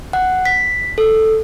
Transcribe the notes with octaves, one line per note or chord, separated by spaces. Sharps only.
F#5
B6
A4